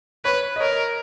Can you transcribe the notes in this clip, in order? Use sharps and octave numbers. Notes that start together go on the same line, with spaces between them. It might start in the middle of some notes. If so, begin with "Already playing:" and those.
B4 C#5
D#5
A#4 C#5